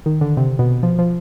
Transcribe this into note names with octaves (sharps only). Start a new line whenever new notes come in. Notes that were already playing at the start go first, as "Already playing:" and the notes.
D#3
D3
C3
B2
F3
F3